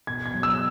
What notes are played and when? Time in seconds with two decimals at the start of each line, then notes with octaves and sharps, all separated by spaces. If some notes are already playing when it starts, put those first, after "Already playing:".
0.07 B2 G#6
0.26 G#6
0.34 F#3
0.43 E6